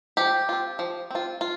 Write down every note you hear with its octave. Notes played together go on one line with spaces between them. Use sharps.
F3 G4
C4 F4
F3
C4 F4
F4